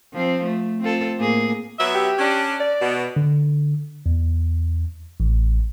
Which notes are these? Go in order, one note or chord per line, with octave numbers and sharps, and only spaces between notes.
F3 C4
A3
C4 F4 A4
A2 A#3 G#4
F#3 B3 E5
G4
C#4 D4
D5
B2
D3
E2
A1